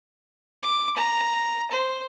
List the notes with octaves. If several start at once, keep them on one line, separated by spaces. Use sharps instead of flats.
D6
A#5
C5